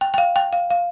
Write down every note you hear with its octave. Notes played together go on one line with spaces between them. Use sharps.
G5
G5
F5
G5
F5
F5